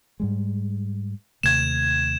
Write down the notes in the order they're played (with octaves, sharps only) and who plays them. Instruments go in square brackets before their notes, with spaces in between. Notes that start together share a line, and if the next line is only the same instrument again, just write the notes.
[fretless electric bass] G#2 G3 G#3
[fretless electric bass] D#2 C3 A3 [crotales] G#6 E7